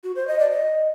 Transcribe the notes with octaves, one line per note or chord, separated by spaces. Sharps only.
F#4
C5
D#5
D5
D#5